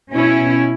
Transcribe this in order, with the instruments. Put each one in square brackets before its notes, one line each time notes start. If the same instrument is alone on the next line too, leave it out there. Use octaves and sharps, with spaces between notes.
[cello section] B2 C#4 E4